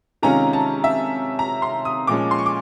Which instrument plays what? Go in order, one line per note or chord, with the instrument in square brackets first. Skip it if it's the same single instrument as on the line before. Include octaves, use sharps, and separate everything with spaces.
[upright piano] C3 D#3 G#3 C#4 F4 A#5
A5
E5
A#5
C6
D#6
A#2 F3 G#3 C#4 D6
C6
C#6
D6